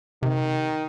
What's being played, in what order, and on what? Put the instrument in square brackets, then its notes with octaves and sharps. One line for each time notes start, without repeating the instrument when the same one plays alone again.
[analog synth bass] C3 [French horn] D#3